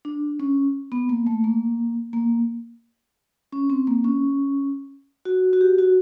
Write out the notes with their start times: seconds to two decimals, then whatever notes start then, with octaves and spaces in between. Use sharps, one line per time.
0.05 D4
0.40 C#4
0.92 B3
1.09 A#3
1.27 A3
1.44 A#3
2.13 A#3
3.52 C#4
3.70 C4
3.87 A#3
4.04 C#4
5.25 F#4
5.53 F#4
5.61 G4
5.79 F#4